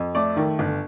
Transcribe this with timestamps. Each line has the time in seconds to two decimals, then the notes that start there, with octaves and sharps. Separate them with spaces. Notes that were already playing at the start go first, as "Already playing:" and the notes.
Already playing: F2
0.15 A3 D5
0.36 D#3
0.59 G1